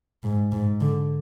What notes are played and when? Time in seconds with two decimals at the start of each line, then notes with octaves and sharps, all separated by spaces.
0.23 G#2
0.52 G#2
0.81 D3